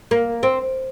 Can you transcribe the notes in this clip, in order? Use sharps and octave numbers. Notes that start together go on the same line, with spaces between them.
A#3
C4